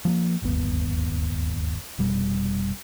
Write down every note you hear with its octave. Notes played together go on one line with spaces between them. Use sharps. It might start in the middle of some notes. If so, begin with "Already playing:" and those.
F3 G#3 A#3
D1 G1 D#2 B3
F1 B2 G3